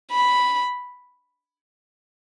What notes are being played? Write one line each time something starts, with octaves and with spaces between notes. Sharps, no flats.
B5